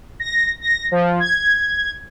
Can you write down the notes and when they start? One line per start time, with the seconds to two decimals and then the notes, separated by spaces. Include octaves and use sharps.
0.20 A#6
0.61 A#6
0.91 F3
1.20 G#6